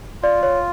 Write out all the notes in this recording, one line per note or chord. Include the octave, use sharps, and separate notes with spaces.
F4 D5
C#5